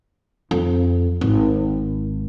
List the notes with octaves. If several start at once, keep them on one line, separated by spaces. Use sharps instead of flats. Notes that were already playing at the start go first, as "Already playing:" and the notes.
F2
G#1